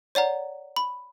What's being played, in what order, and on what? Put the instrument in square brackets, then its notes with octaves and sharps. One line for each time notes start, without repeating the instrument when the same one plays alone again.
[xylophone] C#5 D5 F#5 A#5
B5